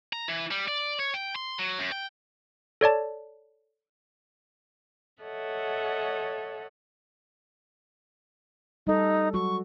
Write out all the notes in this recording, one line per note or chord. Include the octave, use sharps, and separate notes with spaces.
A#5
E3
G3
D5
C#5
G5
C6
F#3
F#2
G5
A4 C#5 D5 A5
A4 C#5 D#5 E5 F#5
G3 D#4 A4
F#3 F#4 C#6